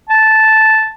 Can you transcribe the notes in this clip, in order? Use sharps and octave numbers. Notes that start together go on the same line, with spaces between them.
A5